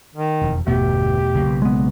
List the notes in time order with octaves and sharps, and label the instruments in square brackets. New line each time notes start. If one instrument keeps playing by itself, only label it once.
[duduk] D#3
[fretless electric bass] E1 F2
[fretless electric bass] G1 B3 [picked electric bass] E2 B2 A3 [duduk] G4
[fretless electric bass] B1 C#3 A#3
[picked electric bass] G#3 B3